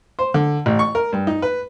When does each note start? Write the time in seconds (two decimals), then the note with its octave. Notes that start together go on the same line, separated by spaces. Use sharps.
0.19 C5
0.34 D3
0.66 A1
0.79 C#6
0.95 A#4
1.13 G2
1.27 D#4
1.42 B4